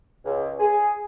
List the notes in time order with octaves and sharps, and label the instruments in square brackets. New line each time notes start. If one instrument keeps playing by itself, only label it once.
[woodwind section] C#2
G#4